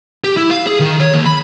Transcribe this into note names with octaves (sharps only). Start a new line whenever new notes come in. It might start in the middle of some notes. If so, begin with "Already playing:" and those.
G4
E4
F5
G#4
D#3
C#5
D#2
B5